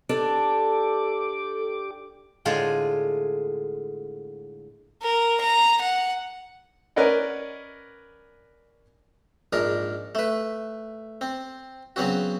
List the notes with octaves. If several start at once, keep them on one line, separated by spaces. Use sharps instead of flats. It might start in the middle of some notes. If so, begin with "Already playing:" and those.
D4 G4 A4 D6
A2 D3 G#3 F4 G#4
A#4
A#5
F#5
C#4 A#4 B4 D5 D#5 F#5
A#1 G#2 D4 A#4
A3 B4
C4
C#3 F#3 B3 C4 F#4